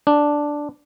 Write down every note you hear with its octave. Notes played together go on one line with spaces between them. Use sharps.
D4